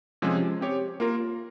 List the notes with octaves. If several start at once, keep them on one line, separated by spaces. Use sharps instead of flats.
C3 F3 G#3 C#4 G#4
C4 G4 C#5
A#3 F4 A#4